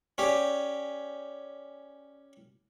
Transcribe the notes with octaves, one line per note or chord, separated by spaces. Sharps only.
C#4 G4 D5 G5 C#6